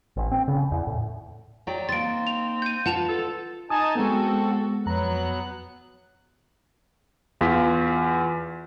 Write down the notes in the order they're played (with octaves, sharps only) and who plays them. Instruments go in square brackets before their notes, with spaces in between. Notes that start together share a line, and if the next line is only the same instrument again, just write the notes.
[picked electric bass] A1
C4
C#3
E2
A2
[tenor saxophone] F#3 [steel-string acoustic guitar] D5 G5 A#5
[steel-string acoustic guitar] A#3 D#4 [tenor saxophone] C4 [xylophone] A6 D7
[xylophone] F7
G6 D#7
[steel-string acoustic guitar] D4 F4 B4 [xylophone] F#5 A5 F7
[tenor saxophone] A4
[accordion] D#4 G#5 A5 [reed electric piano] D#6
[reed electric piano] G#3 B3 [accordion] C4 F#4 A4
[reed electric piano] F2 A#5 [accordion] F#3 B3 F#6
[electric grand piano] E2 F4 B6